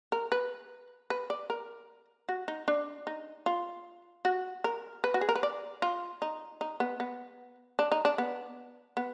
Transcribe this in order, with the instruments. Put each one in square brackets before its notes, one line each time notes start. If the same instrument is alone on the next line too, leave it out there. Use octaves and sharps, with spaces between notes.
[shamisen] A#4
B4
B4
D5
A#4
F#4
D#4
D4
D#4
F4
F#4
A#4
B4
F#4
G#4
A#4
B4
D5
F4
D#4
D#4
B3
B3
D4
D#4
D4
B3
B3